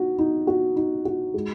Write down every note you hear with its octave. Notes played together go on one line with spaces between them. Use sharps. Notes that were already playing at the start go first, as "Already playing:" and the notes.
Already playing: D#4 F#4
D#4
F#4
D#4
F#4
G#3